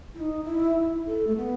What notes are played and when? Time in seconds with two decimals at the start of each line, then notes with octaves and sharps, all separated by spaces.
0.15 E4
0.20 D#4
0.44 E4
1.07 A4
1.27 A3
1.36 B3